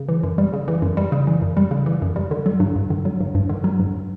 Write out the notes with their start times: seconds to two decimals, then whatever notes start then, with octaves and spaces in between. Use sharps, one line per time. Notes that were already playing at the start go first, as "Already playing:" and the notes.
Already playing: C#3
0.09 E3
0.23 F#2
0.38 G3
0.53 C#3
0.68 E3
0.82 F#2
0.97 G3
1.12 C#3
1.27 E3
1.42 F#2
1.57 G3
1.71 C#3
1.86 E3
2.02 F#2
2.16 G3
2.31 D3
2.46 F#3
2.60 G2
2.76 G2
2.90 D3
3.05 F#3
3.20 G2
3.35 G2
3.49 D3
3.64 F#3
3.80 G2